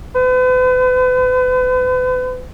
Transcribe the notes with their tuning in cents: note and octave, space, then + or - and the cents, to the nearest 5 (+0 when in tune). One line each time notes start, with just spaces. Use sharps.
B4 +40